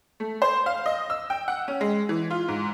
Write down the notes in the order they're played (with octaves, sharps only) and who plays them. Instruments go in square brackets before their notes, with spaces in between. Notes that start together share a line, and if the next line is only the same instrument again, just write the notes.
[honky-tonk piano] A3
C5
F5
D#5
E6
G5
F#5
C#4
G#3
E3
F4
G#2